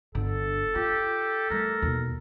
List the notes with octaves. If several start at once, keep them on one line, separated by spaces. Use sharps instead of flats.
G1 D3 A4
F4 G4
G3 A3 A#4
D#2 B2